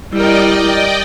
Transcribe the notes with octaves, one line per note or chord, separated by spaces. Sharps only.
G3 E4 A#4 D5 D#5 G5